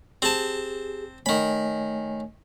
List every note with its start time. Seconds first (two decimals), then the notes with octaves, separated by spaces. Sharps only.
0.22 C4 G4 G#4 A5
1.26 D#3 A3 C#5 G#5 B5